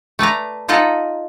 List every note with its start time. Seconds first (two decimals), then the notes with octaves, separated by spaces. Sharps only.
0.19 A3 B4 D5 A#5
0.68 D#4 F4 A4 D#5 F#5 A#5